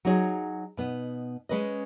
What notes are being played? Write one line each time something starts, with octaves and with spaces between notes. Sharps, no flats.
F#3 D#4 G#4 C#5
B2 B3 D#4
G#3 C#4 B4 D#5